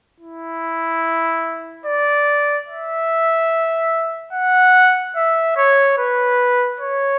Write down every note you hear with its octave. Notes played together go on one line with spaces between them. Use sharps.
E4
D5
E5
F#5
E5
C#5
B4
C#5